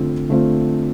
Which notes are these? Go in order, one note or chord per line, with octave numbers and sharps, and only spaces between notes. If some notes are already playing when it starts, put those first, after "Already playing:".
Already playing: D3 A3 C4 F4
D3 A3 C4 F4